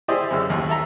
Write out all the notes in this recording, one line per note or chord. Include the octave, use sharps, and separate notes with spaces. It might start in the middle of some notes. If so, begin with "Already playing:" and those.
E4 G4 G#4 C5 D5 D#5
F#2 C#3 E6
A1 D#2
A4 E5 A#5